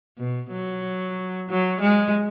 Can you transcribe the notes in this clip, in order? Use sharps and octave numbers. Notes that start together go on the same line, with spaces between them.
B2
F#3
F#3
G#3